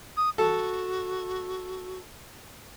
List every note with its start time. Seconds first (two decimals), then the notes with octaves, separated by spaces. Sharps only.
0.17 D#6
0.38 F#4 A4